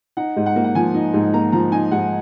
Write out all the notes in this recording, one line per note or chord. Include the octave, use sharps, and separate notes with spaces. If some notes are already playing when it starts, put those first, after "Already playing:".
D#4 F#5
G#2
F#5
A#3
F#5
F3 G#5
D#4
G#2
A#3 A#5
F3 A#5
D#4 G#5
G#2 F#5